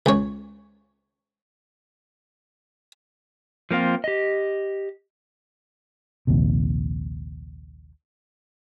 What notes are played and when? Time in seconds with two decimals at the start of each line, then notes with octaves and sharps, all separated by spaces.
0.06 C#2 C#5
3.71 F3 A#3 C4 F4
4.04 G4 D#5
6.27 A#1 D#2 C3